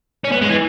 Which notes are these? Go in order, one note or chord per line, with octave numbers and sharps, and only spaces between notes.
C#4
B3
G#3
E3